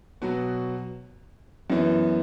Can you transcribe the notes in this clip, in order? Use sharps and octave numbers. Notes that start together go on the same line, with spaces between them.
B2 F#3 B3 F#4
F#2 E3 B3